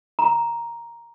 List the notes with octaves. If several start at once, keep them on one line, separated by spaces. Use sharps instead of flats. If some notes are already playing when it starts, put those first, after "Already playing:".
A#5